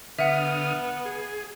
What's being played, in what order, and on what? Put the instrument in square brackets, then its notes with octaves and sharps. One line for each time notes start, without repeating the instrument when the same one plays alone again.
[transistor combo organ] D3 D#6 F6 [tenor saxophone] B3 [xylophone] E5 F#5
[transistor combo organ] G#4